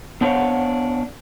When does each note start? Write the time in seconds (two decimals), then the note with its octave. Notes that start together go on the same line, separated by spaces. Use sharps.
0.21 B3 D4 C5 C#5 F5 F#5